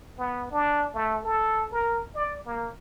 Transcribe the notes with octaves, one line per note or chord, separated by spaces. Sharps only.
B3
D4
A3
A4
A#4
D5
A#3